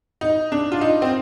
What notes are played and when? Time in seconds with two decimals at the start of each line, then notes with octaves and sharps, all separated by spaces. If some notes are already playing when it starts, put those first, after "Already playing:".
0.21 D#4
0.52 D4
0.72 F4
0.81 D#4
1.02 C4